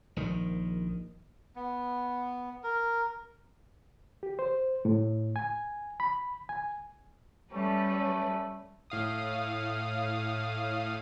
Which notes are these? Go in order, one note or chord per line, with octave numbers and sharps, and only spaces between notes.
A#1 D#3
B3
A#4
G4
C5
A2
G#5
B5
G#5
G3 A3 C#4 B4
A2 F5 D#6